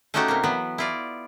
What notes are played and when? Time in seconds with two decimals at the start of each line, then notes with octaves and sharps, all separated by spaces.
0.14 A3 C#4 D#4 F#4 G4 A4
0.28 C3 A#3
0.44 E3 F#3 B3
0.78 E4 F4 D5